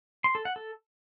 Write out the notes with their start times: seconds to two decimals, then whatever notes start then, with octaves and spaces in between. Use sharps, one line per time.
0.24 C6
0.35 A4
0.45 F#5
0.56 A4